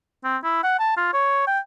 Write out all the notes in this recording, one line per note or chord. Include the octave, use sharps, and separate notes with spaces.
C4
E4
F#5
A5
F4
C#5
G5